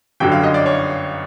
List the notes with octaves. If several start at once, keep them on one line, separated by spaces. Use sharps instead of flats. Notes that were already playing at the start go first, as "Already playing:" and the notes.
G1 F#2 D3 F#3 G5
F5
D#5
D5
C#5